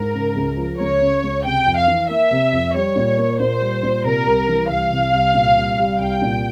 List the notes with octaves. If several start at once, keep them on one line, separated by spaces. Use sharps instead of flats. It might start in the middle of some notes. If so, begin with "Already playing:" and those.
Already playing: G#2 A#4
C#3
C#2
F3
C#2 C#5
C#3
C#2
C3 G5
F2
F5
E3
A#3 E5
C3
F2
G3 C#5
A#2
A#3
A#2 C5
G3
A#2
C3 A#4
C2
E3
C2 F5
C3
C2
A#2
C2
G3
C2 G5
A#2